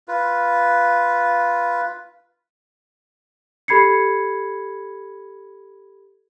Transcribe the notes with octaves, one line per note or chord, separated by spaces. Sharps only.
F4 B4
G4 A4 B5 G#6 C7 C#7